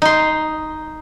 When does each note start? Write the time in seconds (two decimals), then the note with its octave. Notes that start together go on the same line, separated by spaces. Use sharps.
0.02 D#4 C6